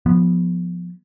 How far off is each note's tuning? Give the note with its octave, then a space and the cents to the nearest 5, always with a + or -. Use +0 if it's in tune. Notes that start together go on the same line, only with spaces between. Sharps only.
F3 +10 B3 -10